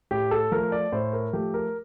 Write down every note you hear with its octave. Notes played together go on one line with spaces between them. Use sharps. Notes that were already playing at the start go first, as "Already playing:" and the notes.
A2 G4
A4
F3 A3 A#4
D5
A2 C5
A#4
F3 A3 G4
A#4